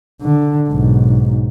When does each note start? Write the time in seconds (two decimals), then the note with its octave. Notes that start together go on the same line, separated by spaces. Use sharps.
0.22 D3
0.69 B1 G#2